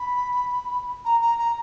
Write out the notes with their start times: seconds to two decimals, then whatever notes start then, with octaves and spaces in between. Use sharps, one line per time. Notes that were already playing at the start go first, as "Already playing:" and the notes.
Already playing: B5
1.05 A#5
1.21 A#5
1.39 A#5